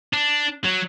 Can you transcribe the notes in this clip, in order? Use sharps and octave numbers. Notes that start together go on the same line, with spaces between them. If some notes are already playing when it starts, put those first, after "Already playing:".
D4
F#3